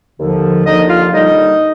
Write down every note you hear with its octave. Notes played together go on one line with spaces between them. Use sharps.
D#2 D3 F3
D#2 D3 F3 D#4 D#5
F4 F5
D#2 D3 G3 D#4 D#5